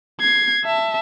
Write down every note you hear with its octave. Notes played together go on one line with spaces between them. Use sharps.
G#6 C7
E5 A5